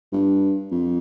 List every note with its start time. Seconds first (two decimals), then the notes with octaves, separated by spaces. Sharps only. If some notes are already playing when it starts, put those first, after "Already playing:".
0.13 G2
0.71 F2